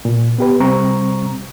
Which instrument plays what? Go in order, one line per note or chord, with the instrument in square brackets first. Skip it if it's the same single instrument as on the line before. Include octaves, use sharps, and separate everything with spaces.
[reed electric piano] A#2
B3 G4 B4
C3 G3 C4 A#5 C#6